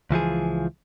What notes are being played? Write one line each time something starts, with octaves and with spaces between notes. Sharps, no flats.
C#2 E3 F3 G#4